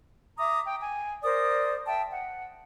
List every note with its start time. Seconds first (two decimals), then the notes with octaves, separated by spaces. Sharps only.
0.37 E5 A#5 D6 D#6
0.66 G5
0.81 G#5
1.23 A#4 C5 D5 D#6
1.87 E5 G5 A5
2.11 F#5